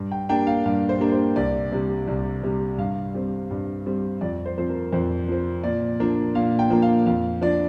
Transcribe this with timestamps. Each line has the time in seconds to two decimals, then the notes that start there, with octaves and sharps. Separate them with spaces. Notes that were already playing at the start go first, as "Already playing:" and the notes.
Already playing: G2
0.12 G5
0.29 G3 A#3 D4 G5
0.47 F5
0.66 G2 F5
0.89 C5
1.00 G3 A#3 D4
1.12 C5
1.36 C2 D5
1.72 C3 G3
2.08 C2
2.43 C3 G3
2.78 G2 F5
3.14 G3 C4
3.51 G2
3.86 G3 C4
4.21 F2 D5
4.45 C5
4.58 F3 C4 C5
4.69 A#4
4.93 F2 C5
5.28 F3 C4
5.63 A#2 D5
6.00 F3 A#3 D4
6.35 A#2 F5
6.59 G5
6.70 F3 A#3 D4
6.82 F5
7.06 F2 F5
7.42 F3 D4 D5